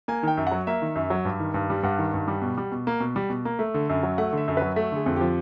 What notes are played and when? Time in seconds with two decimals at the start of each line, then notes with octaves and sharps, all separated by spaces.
0.08 A#3 G#5
0.23 D#3 G5
0.37 F#2
0.47 F#3 F#5
0.67 A#3 E5
0.82 D#3
0.96 F#2
1.10 F#3
1.25 G2
1.39 D#3
1.54 G2
1.70 G3
1.83 G2 F#5
1.98 D#3
2.14 G2
2.28 G3
2.42 B2
2.57 G3
2.72 B2
2.87 A#3
3.00 B2
3.16 G3
3.30 B2
3.45 A#3
3.59 A3
3.74 D3
3.89 F#2
4.03 F#3
4.18 A3 F#5
4.33 D3 E5
4.48 F#2
4.57 F#3 B4
4.76 A3 A4
4.92 D3 G#4
5.06 F2
5.16 F3 G4